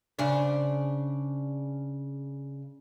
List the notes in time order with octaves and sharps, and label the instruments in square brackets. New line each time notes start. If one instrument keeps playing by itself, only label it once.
[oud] C#3 D4 C5